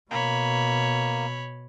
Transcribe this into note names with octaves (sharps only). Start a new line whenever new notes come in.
B2 A#3 C#5 B5